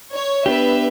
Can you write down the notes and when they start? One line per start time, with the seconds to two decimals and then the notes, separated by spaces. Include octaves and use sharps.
0.13 C#5
0.46 B3 D4 G4 B4 E5